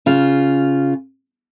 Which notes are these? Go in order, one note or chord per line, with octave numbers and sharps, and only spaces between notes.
C#3 F4